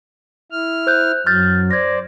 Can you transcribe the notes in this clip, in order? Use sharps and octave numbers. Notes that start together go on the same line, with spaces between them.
E4 F6
C5 F#6 G6
F#2 F#3 F6 G6 A6
C5 D5 G#6 A#6